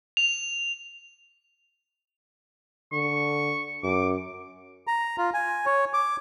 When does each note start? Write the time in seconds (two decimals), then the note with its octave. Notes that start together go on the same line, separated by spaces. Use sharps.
0.17 F7
2.92 D3 C#6
3.83 F#2 D6
4.87 A#5
5.18 F4
5.34 G#5
5.66 C#5
5.93 D6